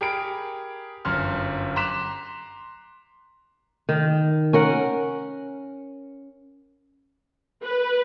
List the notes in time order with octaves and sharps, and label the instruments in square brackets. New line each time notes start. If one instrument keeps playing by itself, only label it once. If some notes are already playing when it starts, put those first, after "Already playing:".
[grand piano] G4 G#4 A#4 B5 D7
G1 F#2 C6 F6
A#5 C6 D6 F#6 B6 E7
[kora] D#3
C#4 A#4 F#5
[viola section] B4